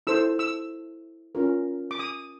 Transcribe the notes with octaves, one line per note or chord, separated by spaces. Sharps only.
E4 A4 C5 E6
E6
C#4 F4 A#4
D6
D#6